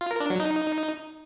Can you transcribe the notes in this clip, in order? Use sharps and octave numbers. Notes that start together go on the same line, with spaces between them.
F4
A#4
D4
F#3
D#4